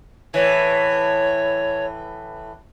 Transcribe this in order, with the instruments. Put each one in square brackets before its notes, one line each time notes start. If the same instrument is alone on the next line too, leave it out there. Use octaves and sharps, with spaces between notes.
[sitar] A2 E3 [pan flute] C#5